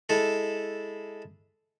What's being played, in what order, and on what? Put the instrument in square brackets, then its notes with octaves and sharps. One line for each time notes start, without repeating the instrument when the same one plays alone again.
[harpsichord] G#3 E4 A4